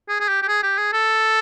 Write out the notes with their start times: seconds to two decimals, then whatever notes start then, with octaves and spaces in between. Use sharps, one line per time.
0.09 G#4
0.20 G#4
0.28 G4
0.42 G4
0.48 G#4
0.63 G4
0.78 G#4
0.92 A4